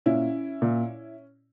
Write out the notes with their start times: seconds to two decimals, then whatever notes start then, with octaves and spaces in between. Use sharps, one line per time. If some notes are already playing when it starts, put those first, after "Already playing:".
0.06 A#2 C#4 E4
0.62 A#2